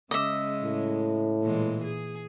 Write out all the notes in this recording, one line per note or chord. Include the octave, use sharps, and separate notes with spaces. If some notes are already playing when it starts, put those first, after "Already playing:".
C#3 G#3 D#5 E5
A2
A#2 E3 G#3
G#4